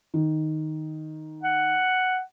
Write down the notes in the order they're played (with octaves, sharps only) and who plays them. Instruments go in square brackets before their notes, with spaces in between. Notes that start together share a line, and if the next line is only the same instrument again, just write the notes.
[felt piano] D#3
[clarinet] F#5